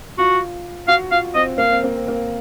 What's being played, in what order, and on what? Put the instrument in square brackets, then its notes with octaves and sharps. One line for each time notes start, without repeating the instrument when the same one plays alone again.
[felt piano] F4 [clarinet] F#4
[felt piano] F#4 [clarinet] F5
[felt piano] F4 [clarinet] F5
[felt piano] C4 [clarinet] D#5
[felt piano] A#3 [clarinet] F5
[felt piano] C4
A#3
C4
A#3